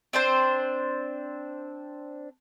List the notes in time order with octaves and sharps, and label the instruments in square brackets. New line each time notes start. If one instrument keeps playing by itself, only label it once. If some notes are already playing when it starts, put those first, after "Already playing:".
[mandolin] C4 D4 C5